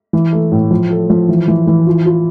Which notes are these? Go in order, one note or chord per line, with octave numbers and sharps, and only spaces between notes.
E3
A3
A2
F3
A4
F3
E3
E3
E3
F4
F4